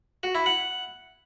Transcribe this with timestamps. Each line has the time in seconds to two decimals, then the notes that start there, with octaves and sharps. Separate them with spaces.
0.23 F#4
0.35 E4
0.46 F#5